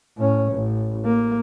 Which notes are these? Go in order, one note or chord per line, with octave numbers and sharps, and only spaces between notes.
A2 C#4
A1
A#3